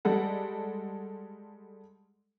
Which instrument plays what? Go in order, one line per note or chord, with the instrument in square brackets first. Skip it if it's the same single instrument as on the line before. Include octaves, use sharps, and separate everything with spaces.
[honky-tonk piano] G3 G#3 A4 F#5